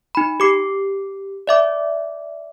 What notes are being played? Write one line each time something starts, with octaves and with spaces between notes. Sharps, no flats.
D#4 B5
G4 D6 C7
D5 E5 D6